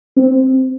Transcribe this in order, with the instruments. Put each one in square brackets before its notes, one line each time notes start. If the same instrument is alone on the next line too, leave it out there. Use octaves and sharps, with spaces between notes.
[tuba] C4